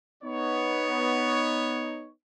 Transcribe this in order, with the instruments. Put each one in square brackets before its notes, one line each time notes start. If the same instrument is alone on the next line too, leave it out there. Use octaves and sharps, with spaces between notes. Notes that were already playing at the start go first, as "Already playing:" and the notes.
[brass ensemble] B3 D#4 C#5